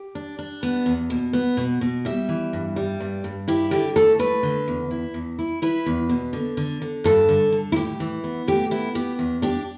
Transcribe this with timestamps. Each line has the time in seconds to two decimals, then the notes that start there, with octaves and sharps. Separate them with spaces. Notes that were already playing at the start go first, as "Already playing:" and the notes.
Already playing: G4
0.15 D4
0.39 D4
0.63 B3
0.86 E2
1.10 B2
1.33 B3
1.57 B2
1.81 B2
2.05 G3 E5
2.29 E3
2.53 G2
2.76 G3
3.00 G2
3.24 G2
3.48 E4 G4
3.71 D3 G4
3.96 A3 A4
4.19 A3 B4
4.43 D3
4.68 E2
4.91 E4
5.14 E2
5.39 E4
5.62 E4 B4
5.86 E2
6.09 B2
6.33 D3
6.57 D3
6.82 D3
7.04 G2 A4
7.29 D3
7.52 D3
7.72 E4
7.76 A2 G4
8.00 E3
8.24 B3
8.48 A2 G4
8.71 B3 E4
8.95 B3 G4
9.19 E2
9.42 D4 G4